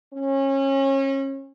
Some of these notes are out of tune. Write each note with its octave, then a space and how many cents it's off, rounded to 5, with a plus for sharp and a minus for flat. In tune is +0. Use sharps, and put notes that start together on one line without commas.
C#4 -30